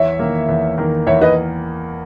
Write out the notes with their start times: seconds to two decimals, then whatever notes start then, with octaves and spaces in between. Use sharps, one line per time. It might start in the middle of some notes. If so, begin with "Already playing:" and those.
Already playing: E2 C#5 E5
0.19 D#3 A#3
0.49 E2
0.78 D#3 A#3
1.07 E2 C#5 E5
1.21 B4 D#5